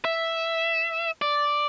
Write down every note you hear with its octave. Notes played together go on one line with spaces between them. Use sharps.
E5
D5